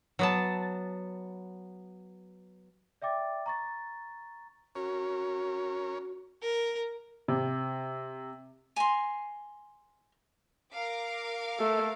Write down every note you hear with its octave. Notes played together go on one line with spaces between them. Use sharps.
F#3 B3 A5
D5 E5 G5 D6 A6
A#5 C#6 A6
C#4 F#4 A#4 C#5
A#4
C3
G#5 A#5 C6
A#4 F5 D6
A3 A4